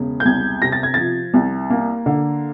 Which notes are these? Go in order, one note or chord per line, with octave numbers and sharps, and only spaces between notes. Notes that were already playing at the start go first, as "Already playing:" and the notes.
Already playing: E1 C#3
G6
C2 G#6
C3 A#6
A6
G#6
F3 A6
C2
A#3
D3